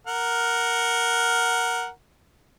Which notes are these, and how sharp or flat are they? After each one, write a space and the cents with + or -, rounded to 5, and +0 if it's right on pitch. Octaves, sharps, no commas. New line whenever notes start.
A#4 +0 F#5 +0